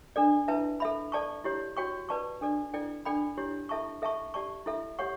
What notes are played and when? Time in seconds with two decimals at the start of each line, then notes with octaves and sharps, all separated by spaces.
0.16 D4 A4 D5
0.48 E4 B4 E5 A5
0.80 A4 E5 B5
1.12 A4 D5 A5 C#6
1.44 E4 G4 C#5
1.77 F#4 C#5 G5 C#6
2.09 B4 D5 A5 C#6
2.41 D4 A4 D5
2.74 E4 A4 D5 G5
3.05 D4 A4 D5 G5 B5
3.37 E4 G4 C#5
3.69 E4 A4 E5 A5 C#6
4.02 A4 E5 A5 C#6
4.34 G4 D5 A5 C#6
4.66 E4 A4 E5
4.99 G4 C#5 F#5 C#6